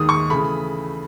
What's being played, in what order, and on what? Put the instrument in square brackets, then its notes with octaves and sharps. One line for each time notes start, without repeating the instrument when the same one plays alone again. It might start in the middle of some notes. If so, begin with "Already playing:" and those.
Already playing: [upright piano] D#2 D#3 G#3 D#6
C#6
C#3 E3 A3 B5